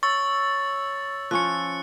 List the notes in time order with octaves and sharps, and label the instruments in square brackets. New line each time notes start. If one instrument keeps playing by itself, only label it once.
[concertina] C#5 [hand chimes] C#6 [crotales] E6 A6
[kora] F3 C#4 [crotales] F#6 C#7